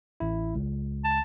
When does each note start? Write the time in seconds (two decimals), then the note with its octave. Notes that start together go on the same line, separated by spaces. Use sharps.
0.20 A1 E4
0.55 C#2
1.04 A5